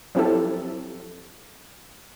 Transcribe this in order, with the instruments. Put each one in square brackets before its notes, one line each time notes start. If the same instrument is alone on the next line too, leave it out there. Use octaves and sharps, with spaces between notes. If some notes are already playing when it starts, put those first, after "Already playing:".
[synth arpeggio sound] F3 F#3 C4 E4 G4 A4